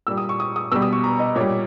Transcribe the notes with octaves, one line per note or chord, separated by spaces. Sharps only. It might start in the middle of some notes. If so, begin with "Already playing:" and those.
A#2 G3 E6
D#6
C#6
D#6
D#6
B2 G3 E6
D#6
C#6
A#5
D#5
A#2 G3 C#5